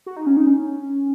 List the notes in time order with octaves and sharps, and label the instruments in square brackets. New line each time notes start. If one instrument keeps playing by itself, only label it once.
[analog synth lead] F#4
D#4
C#4
D#4
C#4